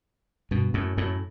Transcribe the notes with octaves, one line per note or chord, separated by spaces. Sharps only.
G2 B2
F#2 A2
F#2 A2